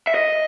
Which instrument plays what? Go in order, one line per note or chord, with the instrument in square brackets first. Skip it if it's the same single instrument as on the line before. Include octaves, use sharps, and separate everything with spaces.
[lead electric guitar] E5
D#5